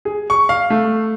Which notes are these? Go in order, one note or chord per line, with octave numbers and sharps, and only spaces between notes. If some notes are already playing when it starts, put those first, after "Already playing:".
G#4
C#6
F5
A3